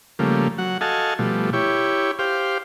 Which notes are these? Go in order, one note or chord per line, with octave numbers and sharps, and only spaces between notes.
C#3 F3 G3 A3 A#3
F#3 F#5
F#4 A4 D#5 F5 G#5 A5
B2 F3 G3 A3
E4 G4 C#5
G4 C5 F5